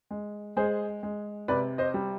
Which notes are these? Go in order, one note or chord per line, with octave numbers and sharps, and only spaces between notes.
G#3
G#3 G#4 C5
G#3
C3 B4 D5
C5 D#5
G3